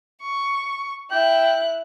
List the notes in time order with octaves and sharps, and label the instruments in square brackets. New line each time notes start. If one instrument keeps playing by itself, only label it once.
[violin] C#6
[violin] E4 F#6 [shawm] G5